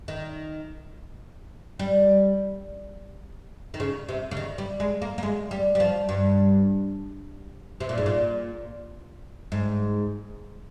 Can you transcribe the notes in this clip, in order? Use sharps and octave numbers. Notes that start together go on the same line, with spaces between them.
D#3
G3
D#3
C#3
C3
C#3
D#3
G3
G#3
A#3
A#3
G#3
G3
G3
F3
G2
C3
A#2
G#2
A#2
G#2